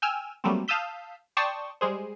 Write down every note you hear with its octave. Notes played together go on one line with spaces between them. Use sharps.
G5 G#5 E6 F6
F#3 G3 A3 A#3 C4
F5 A5 D#6 E6 G6 B6
D5 G5 A5 C6 C#6 D#6
G3 G#3 G#4 C5